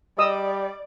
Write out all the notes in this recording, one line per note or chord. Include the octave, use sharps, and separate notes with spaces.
G3 D5 D#5 D#6 E6